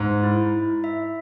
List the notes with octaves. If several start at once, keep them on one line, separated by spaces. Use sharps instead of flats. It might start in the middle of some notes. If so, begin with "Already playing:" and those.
Already playing: G#2
E4
E4
E5